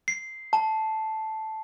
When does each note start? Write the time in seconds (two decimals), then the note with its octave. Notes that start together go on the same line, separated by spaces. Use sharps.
0.08 C7
0.53 A5